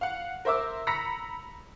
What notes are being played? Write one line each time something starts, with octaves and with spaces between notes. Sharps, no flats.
F5 F#5
A#4 C5 E5 D6 E6
A#5 B5 E6 A#6 B6 C#7